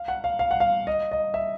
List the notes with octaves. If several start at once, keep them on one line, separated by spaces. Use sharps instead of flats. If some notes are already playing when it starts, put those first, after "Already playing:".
Already playing: F5
F#5
F5
F5
F#5
F5
D#5
D#5
E5